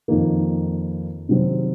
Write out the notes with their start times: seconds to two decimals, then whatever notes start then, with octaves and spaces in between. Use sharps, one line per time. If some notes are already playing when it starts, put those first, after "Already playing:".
0.08 F2 D#3 A#3
1.29 C3 D#3 F#3 C4